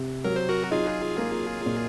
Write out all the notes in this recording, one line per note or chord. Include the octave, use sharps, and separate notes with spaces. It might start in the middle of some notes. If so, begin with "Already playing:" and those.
Already playing: C3
F#3 A#4
C5
F#4 A#4
D#4 F4 G#4
A#3
A#2